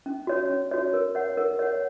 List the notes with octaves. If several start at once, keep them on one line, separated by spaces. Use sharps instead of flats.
C#4
F#4 C#5
C#4
F#4 C#5
A#4
C#5 F#5
A#4
C#5 F#5